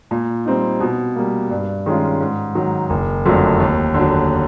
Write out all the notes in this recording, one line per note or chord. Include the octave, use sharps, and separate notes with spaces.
A#2
G3 C4 D#4
B2
G3 A#3
G2
D#3 G#3 C#4 F4
G#2
D#3 F#3
F#1
F2 D3 F#3 A3
D#2
D3
F#3